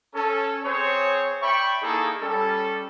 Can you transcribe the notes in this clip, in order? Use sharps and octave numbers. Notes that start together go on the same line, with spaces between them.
C#4 A4
C4 G#4 C5 C#5
D5 E5 G5 B5 C#6
A#3 D#4 E4 G#4 A4 C#6
G3 C#4 A4